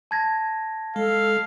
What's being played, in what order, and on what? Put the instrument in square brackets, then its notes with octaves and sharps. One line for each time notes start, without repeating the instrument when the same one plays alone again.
[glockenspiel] A5 G#6 A#6
[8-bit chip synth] G#3 [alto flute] A4 [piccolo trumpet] F5